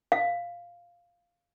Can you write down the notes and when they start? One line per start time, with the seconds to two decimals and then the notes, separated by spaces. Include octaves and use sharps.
0.12 F5